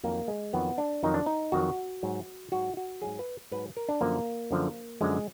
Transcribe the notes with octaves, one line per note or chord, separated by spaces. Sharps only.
F2 D#3 F#3 A#3
G#3
F2 D#3 F#3 B3
D4
F2 D#3 F#3 D#4
D4
D#4
F2 D#3 F#3 F#4
G#2 F#3
G#2 F#3 F#4
F#4
G#2 F#3 G#4
B4
G#2 F#3 B4
A#4
D4
F#2 D3 F3 A#3
F#2 D3 F3
F#2 D3 F3 G#3